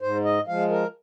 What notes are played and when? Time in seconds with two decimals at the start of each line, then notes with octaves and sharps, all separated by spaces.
0.01 G#2 C5
0.25 D#5
0.47 F3 G#3 F5
0.71 A#4